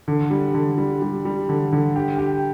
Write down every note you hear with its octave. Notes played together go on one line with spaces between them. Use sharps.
D3
G3
D3
G3
G3
G3
D3
D3
G4
G4